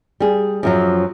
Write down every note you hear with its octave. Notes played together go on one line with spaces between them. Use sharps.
G3 G#4
F#2 F3 F#3